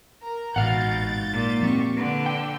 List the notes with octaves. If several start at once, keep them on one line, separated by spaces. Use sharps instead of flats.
A#4 A#5
A1 G#2 B2 F5 F#5 G6 A6
A#2
F3 C4 G4 C#6
D3 B4
G5 E6